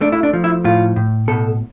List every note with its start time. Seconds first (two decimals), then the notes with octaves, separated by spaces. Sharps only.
0.01 A3 D4
0.12 E4
0.23 D4
0.33 F3
0.44 E4
0.64 A2 F4
0.96 A2
1.28 B2 A4